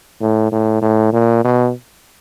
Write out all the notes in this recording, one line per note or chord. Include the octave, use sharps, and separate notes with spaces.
A2
A2
A2
A#2
B2